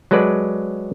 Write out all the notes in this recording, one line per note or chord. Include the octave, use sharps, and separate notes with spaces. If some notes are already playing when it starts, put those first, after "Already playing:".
F#3 G#3 A4 B4 D5